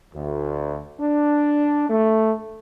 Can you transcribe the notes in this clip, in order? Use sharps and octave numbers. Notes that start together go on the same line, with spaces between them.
D2
D4
A3